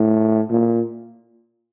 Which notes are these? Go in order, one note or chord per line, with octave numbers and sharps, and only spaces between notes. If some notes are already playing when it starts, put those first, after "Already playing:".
Already playing: A2
A#2